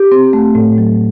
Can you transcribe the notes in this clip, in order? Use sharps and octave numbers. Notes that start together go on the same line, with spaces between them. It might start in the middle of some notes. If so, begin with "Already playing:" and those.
Already playing: G4
C4
A3
A2
F#3